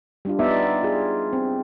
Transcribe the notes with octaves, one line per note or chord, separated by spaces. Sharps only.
G3 D4 F4
B3 D#4 D5 E5
F4 G#4
C4